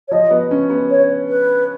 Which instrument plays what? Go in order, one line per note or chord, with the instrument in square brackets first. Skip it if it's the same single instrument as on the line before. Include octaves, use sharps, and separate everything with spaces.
[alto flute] C#5
[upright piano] F3 [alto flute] D#5
[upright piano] B3
C#4
B3
[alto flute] C#5
B4